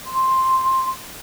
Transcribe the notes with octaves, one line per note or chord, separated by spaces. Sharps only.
C6